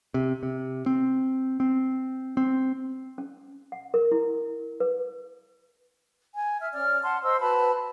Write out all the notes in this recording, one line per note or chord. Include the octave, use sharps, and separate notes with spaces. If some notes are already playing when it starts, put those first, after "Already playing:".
C3
C3
C4
C4
C4
C#4
F#5
A#4
E4
B4
G#5
E5 F6
C#4 D5 F6
F#5 A5 C6
C5 D#5 C6 E6
F#4 B4 A5 B5